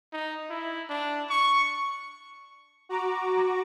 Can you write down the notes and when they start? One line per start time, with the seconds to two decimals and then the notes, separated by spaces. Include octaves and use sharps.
0.13 D#4
0.50 E4
0.90 D4
1.29 C#6
2.89 F#4 A#5 D6